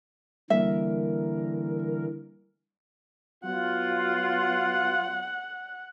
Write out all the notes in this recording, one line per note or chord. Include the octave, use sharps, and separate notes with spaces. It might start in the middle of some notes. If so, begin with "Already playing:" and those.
D3 E3 G3 A#3 A#4 E5
F#3 B3 F4 F#5